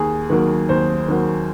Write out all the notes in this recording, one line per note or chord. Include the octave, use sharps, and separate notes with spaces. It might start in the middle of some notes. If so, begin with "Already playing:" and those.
Already playing: D#2 G#4
D#3 F#3 A#3
D#2 C5
D#3 F#3 A#3